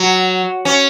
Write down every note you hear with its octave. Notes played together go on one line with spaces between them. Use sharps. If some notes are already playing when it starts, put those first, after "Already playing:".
Already playing: F#3
C#4